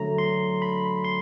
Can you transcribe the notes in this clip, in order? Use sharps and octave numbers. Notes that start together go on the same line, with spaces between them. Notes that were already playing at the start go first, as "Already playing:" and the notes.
Already playing: D3 F#3 A3 A#5
C6
B5
C6